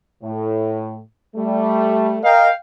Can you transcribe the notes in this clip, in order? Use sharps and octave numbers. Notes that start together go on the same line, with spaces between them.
A2
G3 A3
A#4 D#5 F5 G5